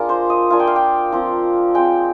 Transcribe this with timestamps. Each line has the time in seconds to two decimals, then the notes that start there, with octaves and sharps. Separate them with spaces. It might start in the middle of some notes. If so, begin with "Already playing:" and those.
Already playing: G#3 D4 F4 A#4
0.09 C5
0.30 D#5
0.50 A#3 D4 F4 G#5
0.59 G5
0.67 F5
0.76 G5
1.12 F3 C4 F4
1.74 G#3 C4 F4 G5